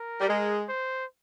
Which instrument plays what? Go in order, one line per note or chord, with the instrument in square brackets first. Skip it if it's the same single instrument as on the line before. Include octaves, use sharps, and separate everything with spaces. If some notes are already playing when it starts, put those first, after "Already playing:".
Already playing: [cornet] A#4
[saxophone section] G3
G#3
[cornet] C5